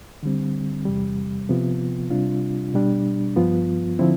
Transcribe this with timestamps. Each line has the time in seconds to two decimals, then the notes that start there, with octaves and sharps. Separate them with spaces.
0.23 D3 G3 C4
0.85 E2 C3 G3
1.49 C3 F3 B3 F4
2.10 C3 G3 D4 F4
2.74 B2 G3 D4
3.36 G2 F3 B3 F4
3.99 D3 F3 C4 E4